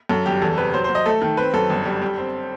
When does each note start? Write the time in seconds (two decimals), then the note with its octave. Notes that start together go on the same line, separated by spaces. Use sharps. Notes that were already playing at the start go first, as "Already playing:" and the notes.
0.09 F#2 A4
0.26 G1 G4
0.42 E2 A4
0.58 C3 B4
0.74 F#3 C5
0.84 C5
0.89 F#3
0.95 D#5
1.06 A3 A4
1.21 D#3 A4
1.37 C4 B4
1.54 F#2 A4
1.70 G1
1.86 G3
2.02 G3
2.17 C4